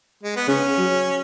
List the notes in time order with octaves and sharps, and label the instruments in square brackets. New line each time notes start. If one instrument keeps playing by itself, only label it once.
[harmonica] G#3
B3
[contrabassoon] C#3 [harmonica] C#4
[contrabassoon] F#3